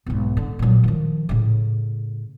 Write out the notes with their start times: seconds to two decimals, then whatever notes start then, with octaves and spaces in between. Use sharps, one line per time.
0.06 B1 G#2
0.37 D3
0.59 A#2 F#3
0.84 D#3 F3
1.29 A2 C#3